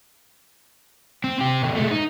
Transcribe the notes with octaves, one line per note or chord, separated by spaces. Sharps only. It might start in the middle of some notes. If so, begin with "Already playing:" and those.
C4
C4 G4
B2 D3
G#3 A3
D#4